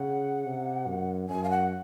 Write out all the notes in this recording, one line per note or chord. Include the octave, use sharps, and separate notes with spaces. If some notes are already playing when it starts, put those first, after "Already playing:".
Already playing: C#3 F#5
C3
F#2
F#2 G#5
F5
F#5